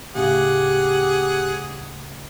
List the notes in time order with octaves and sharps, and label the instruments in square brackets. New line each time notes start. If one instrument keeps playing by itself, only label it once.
[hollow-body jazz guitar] D2 A2 C#3 [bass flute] G4 [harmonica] G#4 F#5